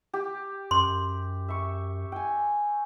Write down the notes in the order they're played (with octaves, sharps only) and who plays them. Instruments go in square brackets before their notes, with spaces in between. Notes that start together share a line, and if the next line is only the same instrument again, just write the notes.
[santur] G4
[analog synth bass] F#2 [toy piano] C6
[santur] E5 C#6
G5 G#5